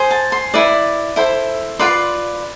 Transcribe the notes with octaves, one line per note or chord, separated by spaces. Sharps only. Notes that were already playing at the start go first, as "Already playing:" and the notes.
Already playing: G#4 C5
A5
C6
E4 B4 D5
E4 A4 C5
F4 B4 D5 C6